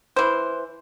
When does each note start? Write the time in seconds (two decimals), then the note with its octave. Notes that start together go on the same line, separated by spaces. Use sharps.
0.16 E3 C5